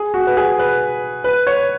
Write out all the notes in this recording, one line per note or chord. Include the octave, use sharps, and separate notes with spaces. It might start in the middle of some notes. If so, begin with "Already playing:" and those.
Already playing: G#4
F#4
B4
G#4
B4
B4
C#5